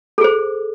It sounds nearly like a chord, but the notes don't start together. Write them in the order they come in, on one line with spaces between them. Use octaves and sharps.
A4 G#4 C5